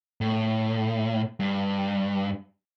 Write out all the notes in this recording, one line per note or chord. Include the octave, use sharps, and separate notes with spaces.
A2
G2